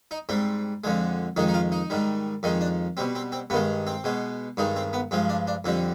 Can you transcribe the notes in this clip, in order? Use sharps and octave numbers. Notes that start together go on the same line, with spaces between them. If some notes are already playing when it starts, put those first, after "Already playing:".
D#4
G#2 G3 C4
F2 D3 G#3
F2 D#3 G#3 D#4
D#4
F4
D#4
G#2 D#3 G3
F2 D#3 G#3 D#4
D4
B2 G3 C4
C4
C4
G2 D#3 G#3 B3
C4
B2 G#3
G2 D#3 G#3 D#4
C4
B3
G2 F3 G#3 C4
D4
D4
F2 D3 G3 C4